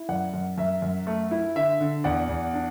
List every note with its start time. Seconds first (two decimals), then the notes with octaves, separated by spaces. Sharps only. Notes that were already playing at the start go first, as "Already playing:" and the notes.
Already playing: E4
0.09 F#2 D5 F#5
0.34 F#2
0.58 F#2 E5
0.82 F#2
1.07 A3
1.31 E4
1.55 D3 E5
1.81 D3
2.04 E2 D5 F#5
2.29 E2
2.54 D4